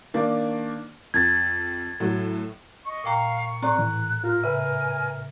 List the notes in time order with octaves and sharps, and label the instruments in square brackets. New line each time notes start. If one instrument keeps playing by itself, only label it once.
[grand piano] D#3 A#3 D4
[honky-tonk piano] F2 [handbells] G#6 A6
[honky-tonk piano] A2 F#3
[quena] D#5 [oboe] C#6
[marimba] A#2 G5 A#5 [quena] F5
[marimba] A2 A#5 [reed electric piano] C4 D5 [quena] F#6
[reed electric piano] E3
[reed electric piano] F4 [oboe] A#4
[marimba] C#3 [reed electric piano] B4 E5 [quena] G#5